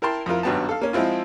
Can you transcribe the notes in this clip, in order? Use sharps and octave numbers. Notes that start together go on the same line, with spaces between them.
E4 A#4 G5 A5 C6
F2 E4 F4 A#4
G#1 G2 F#3 B3 G5 A5
A4 F5
A#3 C#4
F3 G#3 C4 E4 F4